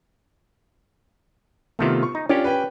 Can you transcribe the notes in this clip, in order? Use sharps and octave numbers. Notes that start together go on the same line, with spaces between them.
C3 D#3 A3 B3 F4
C#6
D#4
C#4 D4 F4 G4
B4 G5